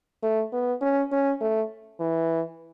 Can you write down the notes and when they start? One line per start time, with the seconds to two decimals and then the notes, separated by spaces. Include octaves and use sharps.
0.23 A3
0.53 B3
0.82 C#4
1.12 C#4
1.41 A3
2.00 E3